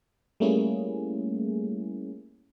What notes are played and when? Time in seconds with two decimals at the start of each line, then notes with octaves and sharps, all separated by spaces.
0.40 G3 A3 A#3 C#4 E4 G#4